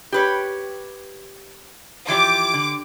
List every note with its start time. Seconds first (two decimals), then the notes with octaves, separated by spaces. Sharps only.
0.12 G4 B4 C#5
2.08 E3 F3 G4 D6
2.53 D3